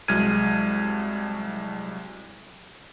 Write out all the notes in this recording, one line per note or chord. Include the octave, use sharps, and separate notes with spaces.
C2 F#3 G#3 F6 G#6 D#7